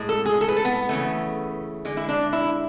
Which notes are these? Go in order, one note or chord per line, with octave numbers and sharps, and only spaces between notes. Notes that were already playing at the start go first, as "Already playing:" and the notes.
Already playing: A2 G#3
A4
G#4
A4
B4
A4
B3
C#3 E3 A3
D3 G#3
E4
D4
E4